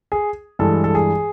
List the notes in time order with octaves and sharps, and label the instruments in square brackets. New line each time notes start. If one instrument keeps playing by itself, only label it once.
[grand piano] G#4
G2 E3 G#3 A4
A4
G#4